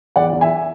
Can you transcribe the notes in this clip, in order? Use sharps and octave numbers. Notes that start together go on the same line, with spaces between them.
E2 D5 F#5
E2
E5 G#5